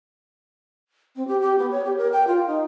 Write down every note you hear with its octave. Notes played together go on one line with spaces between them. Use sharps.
C4
G4
G4
B3
C#5
G4
A#4
G5
F4
D#4